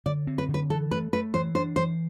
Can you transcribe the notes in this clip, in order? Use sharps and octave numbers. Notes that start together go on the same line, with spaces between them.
D3 D5
C4
B4
D3
B4
E3 A4
A3 B4
A3 B4
E3 C5
D4 C5
E3 C5